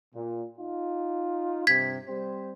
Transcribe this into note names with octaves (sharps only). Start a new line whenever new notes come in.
A#2
D#4 F4
G2 C3 G#6 B6
G3 C4 C5